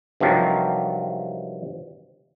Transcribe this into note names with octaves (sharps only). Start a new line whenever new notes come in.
G2 C3 D#3 F3 F#3